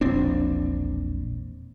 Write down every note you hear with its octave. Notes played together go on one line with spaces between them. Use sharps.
E1 A#1 C4 D4